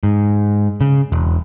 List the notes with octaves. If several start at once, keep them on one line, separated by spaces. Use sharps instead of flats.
G#2
C#3
E1